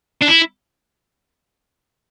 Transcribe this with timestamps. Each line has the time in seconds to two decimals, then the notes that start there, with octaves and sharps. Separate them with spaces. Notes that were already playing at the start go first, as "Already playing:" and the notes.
0.21 D4
0.28 E4